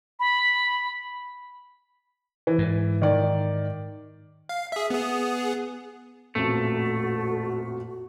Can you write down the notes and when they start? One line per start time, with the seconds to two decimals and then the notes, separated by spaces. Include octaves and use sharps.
0.20 B5
2.47 E3
2.58 G#2
3.02 D#3 D5
4.49 F5
4.72 G#4 E5
4.90 B3 G#4
6.35 A1 F2 A#2 A3 F#4 A4